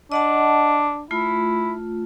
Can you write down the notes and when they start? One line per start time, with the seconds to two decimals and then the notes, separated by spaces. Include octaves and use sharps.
0.12 D4 D#5 F#5 A5
1.11 A3 E4 F4